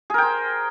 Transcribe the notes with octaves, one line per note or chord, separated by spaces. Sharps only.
G#4 A#4 C5 G5